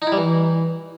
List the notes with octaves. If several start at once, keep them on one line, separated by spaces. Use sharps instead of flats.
D#4
E4
G3
E3